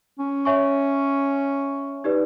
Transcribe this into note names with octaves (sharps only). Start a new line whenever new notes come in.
C#4
C#5 E5 G#5 C#6
D#4 G4 B4 D5